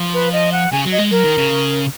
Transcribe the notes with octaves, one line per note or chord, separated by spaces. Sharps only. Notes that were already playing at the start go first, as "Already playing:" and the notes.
Already playing: F3
B4
D#5
F#5
C#3 G#5
F#3
D#5
G#3
F#3 A#4
D#3
C#3